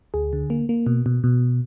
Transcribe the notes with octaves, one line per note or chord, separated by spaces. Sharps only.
D2 G#4
D3
A#3
A#3
B2
B2
B2